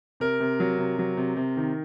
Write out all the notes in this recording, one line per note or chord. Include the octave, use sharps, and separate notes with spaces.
C3 A#4
C3
F#3
C3
F#3
C3
C3
D#3